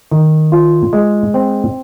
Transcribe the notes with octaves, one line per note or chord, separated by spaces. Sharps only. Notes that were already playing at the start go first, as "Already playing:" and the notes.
D#3
F4
G#3
C4